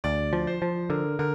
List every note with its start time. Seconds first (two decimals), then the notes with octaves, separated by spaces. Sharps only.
0.04 D2 D5
0.33 F3
0.47 C5
0.62 F3
0.90 D3 A#4
1.19 D3 A#4